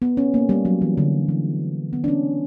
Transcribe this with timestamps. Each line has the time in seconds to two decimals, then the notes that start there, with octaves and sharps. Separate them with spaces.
0.02 B3
0.17 C#4
0.34 A#3
0.49 G3
0.65 F#3
0.81 E3
0.98 D3
1.29 E3
1.93 B3
2.04 D4
2.08 C#4